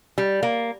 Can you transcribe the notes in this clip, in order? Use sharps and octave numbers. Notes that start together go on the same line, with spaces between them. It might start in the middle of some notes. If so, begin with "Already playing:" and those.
G3
A#3